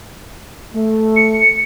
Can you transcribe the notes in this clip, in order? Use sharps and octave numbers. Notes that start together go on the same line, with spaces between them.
A3
C#7